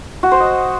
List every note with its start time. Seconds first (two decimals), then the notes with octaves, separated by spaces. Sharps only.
0.23 F#4
0.32 C5
0.40 D#5